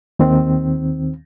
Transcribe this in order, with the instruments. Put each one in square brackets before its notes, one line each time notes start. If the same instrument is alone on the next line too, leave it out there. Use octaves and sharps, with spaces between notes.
[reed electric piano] D#2 D#3 C4